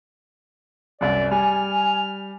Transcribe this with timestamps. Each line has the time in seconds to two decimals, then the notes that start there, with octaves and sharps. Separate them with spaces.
1.01 C2 F#2 D5
1.31 G3 G#5 F6